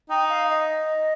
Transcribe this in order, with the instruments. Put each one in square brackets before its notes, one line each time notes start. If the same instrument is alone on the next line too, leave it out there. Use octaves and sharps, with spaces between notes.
[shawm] D#4 [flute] G5
[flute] F5
D#5